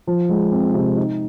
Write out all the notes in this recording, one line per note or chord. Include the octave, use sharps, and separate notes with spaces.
F3
G#3
C4
C3
D#4